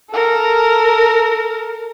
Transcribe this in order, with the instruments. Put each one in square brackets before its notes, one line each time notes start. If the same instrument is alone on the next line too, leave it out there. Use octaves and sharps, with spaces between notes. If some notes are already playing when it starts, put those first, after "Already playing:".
[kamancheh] A4 A#4